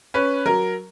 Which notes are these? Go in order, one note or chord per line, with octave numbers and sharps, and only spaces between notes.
C#4 B4
F#3 A#4